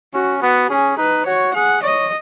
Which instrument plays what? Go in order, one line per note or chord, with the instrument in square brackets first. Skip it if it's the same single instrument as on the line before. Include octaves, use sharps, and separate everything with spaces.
[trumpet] C#4 [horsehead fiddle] F#4
[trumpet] B3 [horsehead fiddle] F#4
[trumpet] C#4 [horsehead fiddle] G#4
[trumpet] D#4 [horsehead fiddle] B4
[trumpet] F#4 [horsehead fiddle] C#5
[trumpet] G#4 [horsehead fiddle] F#5
[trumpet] C#5 [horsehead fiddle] D#5